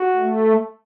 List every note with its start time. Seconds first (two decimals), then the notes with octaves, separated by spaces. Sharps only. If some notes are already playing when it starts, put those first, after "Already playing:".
Already playing: F#4
0.16 A3